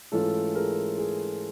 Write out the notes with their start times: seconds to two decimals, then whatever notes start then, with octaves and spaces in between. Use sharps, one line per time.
0.12 G#2 E3 A3 C#4 F4 A4
0.55 G#4 A#4
0.98 G#4